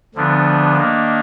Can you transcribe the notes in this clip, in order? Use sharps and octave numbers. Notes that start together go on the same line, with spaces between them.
D2 D3 F3 B3 D4
D#3 A#3 D4